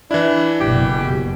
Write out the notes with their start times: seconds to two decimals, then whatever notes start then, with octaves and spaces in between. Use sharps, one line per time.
0.11 E3 D4 E4
0.60 F#1 B2 G4